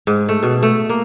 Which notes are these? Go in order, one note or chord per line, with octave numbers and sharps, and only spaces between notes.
G#2
A3
B2
A3
A#3